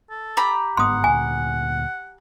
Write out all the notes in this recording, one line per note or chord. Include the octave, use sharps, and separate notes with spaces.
A4
G4 A#5 B5
G1 G#2 B3 F#5 C6 D#6
D2 A#2 G#5